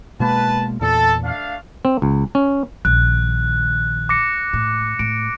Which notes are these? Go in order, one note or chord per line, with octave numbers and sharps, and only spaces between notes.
B2 G#3 A#3 B4 A5
E2 A#2 A4 A5
A3 D4 F5
C4
C#2
C#4
A#1 D#3 F#6
D6 A#6 C#7
A2
A2 D7